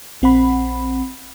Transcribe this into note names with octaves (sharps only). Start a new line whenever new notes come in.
A#1 C4 F#5 B5